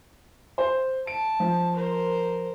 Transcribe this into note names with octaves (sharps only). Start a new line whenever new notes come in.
C5
A5 D7
F3
A#4 C5